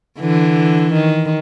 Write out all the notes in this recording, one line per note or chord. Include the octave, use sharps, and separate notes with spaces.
D3 E3
D#3